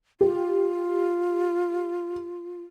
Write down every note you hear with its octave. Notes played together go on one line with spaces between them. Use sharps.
F4 G4